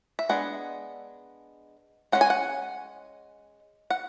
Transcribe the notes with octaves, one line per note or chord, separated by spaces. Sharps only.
E5
G#3 B3 D4 F#5
G#3 C#4 F#5
G#5
F#5
F#5